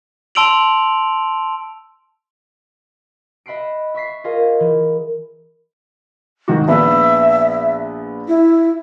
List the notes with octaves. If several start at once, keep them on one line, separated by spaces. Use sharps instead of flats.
A5 C6 E6 D7 F7 F#7
D#5 E5 B5 F#6 C7 D7
E5 C#6 B6 C7
F4 G#4 A#4 D#5 F5
E3
G#2 D#3 F#4
A#1 B3 E5
E4